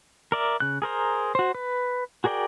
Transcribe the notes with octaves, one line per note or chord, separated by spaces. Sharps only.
A#4 D5 E5
C#3 F#6
G#4 A#4 C5 A#5
F#4 C5
B4
F#4 G#4 A#4 D5 G5